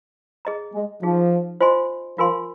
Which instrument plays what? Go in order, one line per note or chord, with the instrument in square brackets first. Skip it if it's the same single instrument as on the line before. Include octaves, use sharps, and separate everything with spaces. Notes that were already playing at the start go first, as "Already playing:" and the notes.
[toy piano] G#4 D#5 A#5
[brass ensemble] G#3
[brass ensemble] F3 [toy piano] D#4 G#4 F5
[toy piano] F4 C5 D#5 G#5 C6
[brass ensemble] F3 [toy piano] F4 A#4 G#5 C6